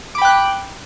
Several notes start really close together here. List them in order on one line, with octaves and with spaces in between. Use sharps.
D6 B5 G5 F#6